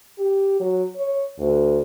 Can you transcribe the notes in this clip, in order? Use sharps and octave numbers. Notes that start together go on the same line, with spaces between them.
G4
F#3
C#5
D2